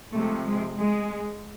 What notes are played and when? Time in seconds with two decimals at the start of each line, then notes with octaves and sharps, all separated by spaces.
0.13 C3 F3 G#3 A3
0.45 G#3
0.76 G#3